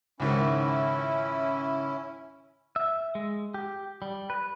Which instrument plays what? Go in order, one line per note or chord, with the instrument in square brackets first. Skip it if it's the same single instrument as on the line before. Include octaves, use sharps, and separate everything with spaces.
[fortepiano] C#2 G#2 D#3 [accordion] C#4 E4
[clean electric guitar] E5
G#3
G4
G3
B4